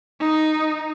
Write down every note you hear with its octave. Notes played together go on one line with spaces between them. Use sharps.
D#4